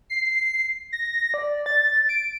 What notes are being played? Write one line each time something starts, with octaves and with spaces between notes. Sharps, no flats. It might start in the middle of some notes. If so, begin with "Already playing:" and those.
C7
A#6
D5
A6
D7